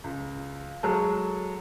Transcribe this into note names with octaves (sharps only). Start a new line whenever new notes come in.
C#2
F#3 G#3 A4